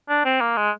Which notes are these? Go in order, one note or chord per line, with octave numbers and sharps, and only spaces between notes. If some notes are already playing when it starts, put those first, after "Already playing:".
D4
C4
A#3
G#3